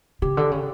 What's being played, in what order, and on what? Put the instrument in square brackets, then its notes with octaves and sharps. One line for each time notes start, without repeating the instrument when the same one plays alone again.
[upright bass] C#3 [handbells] G4
[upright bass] D3
C#3